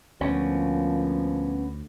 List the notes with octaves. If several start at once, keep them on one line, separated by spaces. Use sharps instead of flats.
D2 A#2 F3 B3 C#4